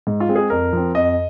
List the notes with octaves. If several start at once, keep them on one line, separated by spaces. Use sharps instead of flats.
G#2
F4
G#3 C4
G#4
F2 A#4
F3 C4
F2 D#5